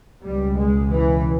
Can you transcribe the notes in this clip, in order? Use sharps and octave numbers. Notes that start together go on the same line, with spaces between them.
C#2 B2 G3
G#3
E3